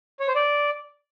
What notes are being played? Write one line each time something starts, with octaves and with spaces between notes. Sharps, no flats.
C#5
C5
D5